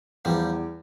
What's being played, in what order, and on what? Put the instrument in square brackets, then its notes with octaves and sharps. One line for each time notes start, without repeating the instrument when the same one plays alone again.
[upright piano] E2 [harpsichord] F3 G3